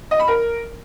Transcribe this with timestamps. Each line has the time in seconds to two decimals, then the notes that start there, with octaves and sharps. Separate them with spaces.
0.11 D#5
0.19 B5
0.28 A#4